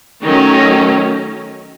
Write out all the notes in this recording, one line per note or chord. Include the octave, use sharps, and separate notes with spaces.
D#3 F#3 A3 C#4